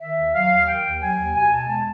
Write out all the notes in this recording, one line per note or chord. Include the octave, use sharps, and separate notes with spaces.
D#3 E5
D#2
F#3 F5
D#2
D#3 G5
D#2
F#3 G#5
D#2
B2 G#5
E2 A5
G#3 A5